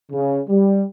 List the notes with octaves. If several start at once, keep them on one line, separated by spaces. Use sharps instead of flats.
C#3
G3